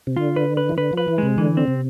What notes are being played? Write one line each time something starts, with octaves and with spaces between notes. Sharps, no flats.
C3
D3 F4
B4
B4
E3
D3 B4
F3 B4
E3
C3 G#3
D3 E3
C4
C3